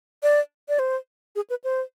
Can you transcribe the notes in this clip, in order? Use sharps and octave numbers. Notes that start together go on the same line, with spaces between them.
D5
D5
C5
G#4
B4
C5